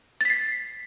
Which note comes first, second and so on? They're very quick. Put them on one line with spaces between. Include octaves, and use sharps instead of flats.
A6 B6 C7